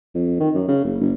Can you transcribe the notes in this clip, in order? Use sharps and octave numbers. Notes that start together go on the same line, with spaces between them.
F2
D#3
F#2
C#3
F#1
F#1